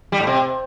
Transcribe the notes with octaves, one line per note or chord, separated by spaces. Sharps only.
G3
A2
C3